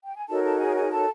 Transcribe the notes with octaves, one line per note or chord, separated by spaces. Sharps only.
G5
G#5
D#4 F#4 A4 A#4 C#5 A5
A4 A5
G#4 G#5
G#4 G#5
A4 A5